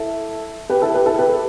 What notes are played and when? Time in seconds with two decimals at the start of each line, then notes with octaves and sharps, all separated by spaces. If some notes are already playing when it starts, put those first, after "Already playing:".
Already playing: E4 A4
0.70 G4 B4
0.82 E4 A4
0.94 G4 B4
1.06 E4 A4
1.18 G4 B4